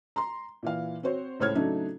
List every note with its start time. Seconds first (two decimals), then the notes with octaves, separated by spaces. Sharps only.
0.16 A#5 C6
0.63 A#2 E3 F5
1.03 C4 F#4 C5 C#5
1.40 C#2 A2 C5 C#5 F6 G#6
1.55 C#3 F#3 A3 D4 D#4